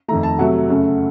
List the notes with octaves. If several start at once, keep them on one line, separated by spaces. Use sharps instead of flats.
F2 D#3 A3 A#5
A5
C3 F#3 A3 F#5
F#2 C#3 A3